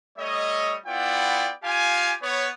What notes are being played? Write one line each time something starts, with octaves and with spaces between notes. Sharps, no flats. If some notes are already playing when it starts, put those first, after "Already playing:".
G3 A3 C#5 D#5
B3 E4 F4 D5 F#5 G5
F4 G4 F5 G#5
B3 C#5